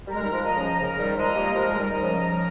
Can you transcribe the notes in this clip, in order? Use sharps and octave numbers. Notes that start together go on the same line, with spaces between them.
G3 A#4
G#3
D#3 G3
F3 G#3
D#5 A#5
C#3 F3
C#3 A#4
D#3 G3
F3 G#3 D#5 A#5
G3 A#3
F3 G#3 A#4
G#3
D#3 G3
D#5 A#5
C#3 F3
A#4